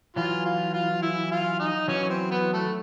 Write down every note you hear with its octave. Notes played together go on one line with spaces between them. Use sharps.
E3 F#3 F4 F5
F4 F5
F4 F5
E4 E5
F4 F5
D#4 D#5
E3 F#3 C#4 C#5
C#5
C4 C5
B3 B4
A3 A4